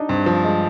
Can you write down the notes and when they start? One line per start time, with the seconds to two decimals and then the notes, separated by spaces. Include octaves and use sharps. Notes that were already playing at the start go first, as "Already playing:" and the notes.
Already playing: D4 D#4
0.09 G2 C4
0.26 F3
0.44 G#3